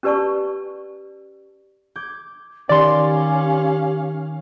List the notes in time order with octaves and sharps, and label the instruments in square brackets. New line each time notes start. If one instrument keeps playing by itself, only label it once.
[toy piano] C#4 G4 B4 D5 A5 C#6
[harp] D6 G6 G#6
[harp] D#3 [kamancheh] C#4 F5 [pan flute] G4 [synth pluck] D5 C6